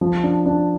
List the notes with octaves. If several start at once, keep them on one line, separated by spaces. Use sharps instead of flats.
F3
D4
D4